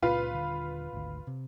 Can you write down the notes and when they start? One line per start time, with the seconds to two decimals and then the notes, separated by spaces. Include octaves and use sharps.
0.02 C#2 A#2 C#3 F4 B4
0.33 D#1 D3
0.93 G#1 D2
1.27 C3